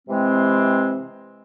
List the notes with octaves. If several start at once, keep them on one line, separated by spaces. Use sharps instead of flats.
C3 E3 G#3 C4